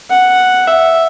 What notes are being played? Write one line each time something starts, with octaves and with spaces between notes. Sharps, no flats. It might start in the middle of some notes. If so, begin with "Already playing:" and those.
F#5
E5